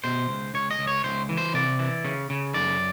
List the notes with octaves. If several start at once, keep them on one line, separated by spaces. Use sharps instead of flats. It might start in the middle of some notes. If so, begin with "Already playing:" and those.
B2 C5
C#2
C#2 C#5
D#5
C#2
C#5
C#2 C5
E3
C5
C3 D5
E3
C#3
C#3
F#2 D5